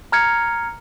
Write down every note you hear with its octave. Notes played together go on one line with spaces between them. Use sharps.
A#5 F6 G#6 C#7